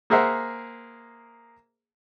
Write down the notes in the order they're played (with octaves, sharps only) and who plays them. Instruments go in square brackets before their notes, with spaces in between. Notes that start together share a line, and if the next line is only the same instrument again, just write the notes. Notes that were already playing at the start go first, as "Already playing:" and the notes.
[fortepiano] A#3 G#4 A#4 C5 E5 F#5